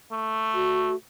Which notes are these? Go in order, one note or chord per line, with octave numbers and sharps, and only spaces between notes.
A3
F#4